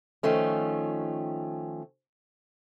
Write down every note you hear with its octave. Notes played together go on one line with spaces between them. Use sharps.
D#3 F3 A3 C#4